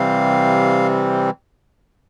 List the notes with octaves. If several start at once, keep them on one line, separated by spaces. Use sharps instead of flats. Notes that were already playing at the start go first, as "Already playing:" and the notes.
Already playing: C3 E3 G3 C4 F5